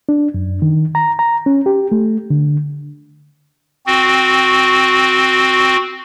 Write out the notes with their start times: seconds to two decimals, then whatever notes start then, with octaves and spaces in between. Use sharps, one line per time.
0.09 D4
0.34 F#2
0.62 D#3
0.95 A#5
1.19 A#5
1.46 C#4
1.66 G4
1.92 A3
2.30 D3
3.86 C4 F#4